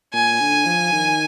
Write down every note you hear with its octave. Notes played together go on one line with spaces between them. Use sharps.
A#2 G#5
D3
F3
D#3